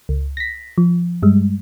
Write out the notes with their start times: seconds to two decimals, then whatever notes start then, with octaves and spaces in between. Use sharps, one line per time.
0.09 C#2
0.37 A#6 B6
0.78 F3
1.22 G2 G3 G#3